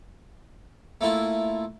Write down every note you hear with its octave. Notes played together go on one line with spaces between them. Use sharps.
A3 A#3 E4 F4